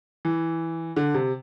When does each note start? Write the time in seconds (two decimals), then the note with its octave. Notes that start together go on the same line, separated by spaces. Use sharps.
0.25 E3
0.96 D3
1.14 C3